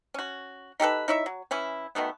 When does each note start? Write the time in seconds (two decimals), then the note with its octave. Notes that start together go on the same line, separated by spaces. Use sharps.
0.14 C#4 F#4
0.80 D#4 G4 A4 B4
1.08 D#4 E4 C#5 E5
1.26 F#3
1.51 E3 C#4 E4
1.95 B2 D#3 A3 B3